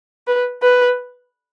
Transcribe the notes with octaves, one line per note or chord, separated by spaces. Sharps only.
B4
B4